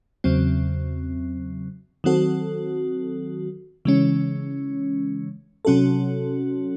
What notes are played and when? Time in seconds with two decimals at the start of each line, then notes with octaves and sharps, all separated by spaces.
0.24 E2 C#3 F#3 C4
2.04 D#3 F#3 C4 F#4 A4
3.85 C#3 E3 G#3 C#4
5.65 C3 F#3 C#4 F#4 A4